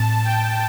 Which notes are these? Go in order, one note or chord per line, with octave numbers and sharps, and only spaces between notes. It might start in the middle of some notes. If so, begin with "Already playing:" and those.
Already playing: A2 C4 A5
G5